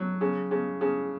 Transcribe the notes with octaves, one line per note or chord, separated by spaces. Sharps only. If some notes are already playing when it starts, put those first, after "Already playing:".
Already playing: F#3
C#3
C#3
C#3